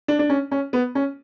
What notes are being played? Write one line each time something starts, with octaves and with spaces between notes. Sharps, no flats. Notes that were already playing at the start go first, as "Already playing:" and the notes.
D4
D4
C#4
C#4
B3
C#4